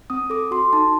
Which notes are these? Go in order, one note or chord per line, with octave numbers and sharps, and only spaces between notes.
C4 D#6
A4 D6
F#4 C6
D#4 A5